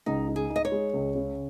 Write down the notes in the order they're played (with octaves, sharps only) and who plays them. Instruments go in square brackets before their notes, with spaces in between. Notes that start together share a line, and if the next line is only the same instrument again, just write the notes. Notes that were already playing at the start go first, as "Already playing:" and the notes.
[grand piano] C#2 [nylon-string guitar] D#4
[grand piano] D#4
[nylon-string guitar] G#4
[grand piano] D#4
[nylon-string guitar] D#5
C#5
[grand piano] G#3
C#2
C#3